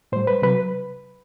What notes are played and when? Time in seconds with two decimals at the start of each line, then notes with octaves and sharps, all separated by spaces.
0.12 A2 G3 C5
0.27 B4
0.42 C3 F#3 B4